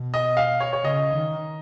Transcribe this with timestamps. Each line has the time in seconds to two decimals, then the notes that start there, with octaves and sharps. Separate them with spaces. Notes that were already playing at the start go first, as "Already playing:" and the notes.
Already playing: B2
0.14 D#5
0.37 F5
0.60 C#5
0.73 C#5
0.84 C#3 D#5
1.15 D#3